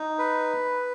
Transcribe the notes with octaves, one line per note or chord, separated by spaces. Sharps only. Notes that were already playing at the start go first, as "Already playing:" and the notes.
Already playing: D#4
B4